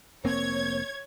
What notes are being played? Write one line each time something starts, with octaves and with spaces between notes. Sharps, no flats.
F1 A#3 C4 C#5 G#6